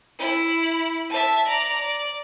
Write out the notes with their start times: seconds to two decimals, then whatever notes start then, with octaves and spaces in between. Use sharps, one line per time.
0.19 E4
1.10 E5 A5
1.47 D5 A#5
1.78 D5